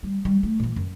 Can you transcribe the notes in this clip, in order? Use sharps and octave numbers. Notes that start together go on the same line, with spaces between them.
G3
G3
A3
A#2 E3
F#2